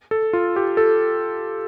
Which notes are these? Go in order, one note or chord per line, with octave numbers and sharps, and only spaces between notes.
A4
F4
G4
A4